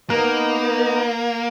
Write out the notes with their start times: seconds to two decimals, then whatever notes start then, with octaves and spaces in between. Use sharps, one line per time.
0.10 A#3 B3 D#4 A#4